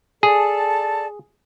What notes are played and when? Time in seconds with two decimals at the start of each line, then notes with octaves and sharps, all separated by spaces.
0.23 G#4 A4 D5 A5